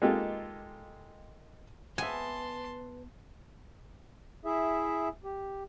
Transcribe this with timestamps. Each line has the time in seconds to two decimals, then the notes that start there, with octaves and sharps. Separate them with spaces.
0.02 G#3 A#3 D#4 F4 G4 A4
1.98 B3 B4 E5 G#5 A5 C6
4.45 E4 G#4 E5
5.24 G4